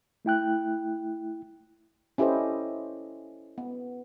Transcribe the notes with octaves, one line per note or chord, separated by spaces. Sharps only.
A3 E4 G5 F#6
C#4 E4 G4 A4 C5 D#5
B3